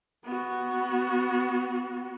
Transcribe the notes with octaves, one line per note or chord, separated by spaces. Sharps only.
B3 F#4